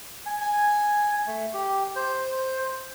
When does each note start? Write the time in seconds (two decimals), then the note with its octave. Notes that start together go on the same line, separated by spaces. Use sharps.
0.26 G#5
0.41 G#5
1.27 A3
1.53 G4
1.96 C5